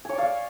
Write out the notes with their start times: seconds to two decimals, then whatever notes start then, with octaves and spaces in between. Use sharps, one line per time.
0.05 G#5
0.09 C#5
0.14 D5
0.18 F5